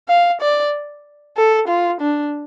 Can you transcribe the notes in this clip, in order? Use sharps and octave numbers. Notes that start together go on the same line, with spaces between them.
F5
D5
A4
F4
D4